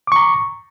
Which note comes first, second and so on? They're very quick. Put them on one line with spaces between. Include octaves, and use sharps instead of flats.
D6 C#6 A#5